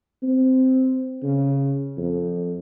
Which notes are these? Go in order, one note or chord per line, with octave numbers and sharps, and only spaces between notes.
C4
C#3
F2